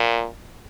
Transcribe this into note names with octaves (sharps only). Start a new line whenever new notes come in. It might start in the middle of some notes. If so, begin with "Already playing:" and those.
Already playing: A#2